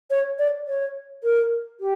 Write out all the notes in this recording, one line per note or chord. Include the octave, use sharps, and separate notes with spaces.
C#5
D5
C#5
A#4
G4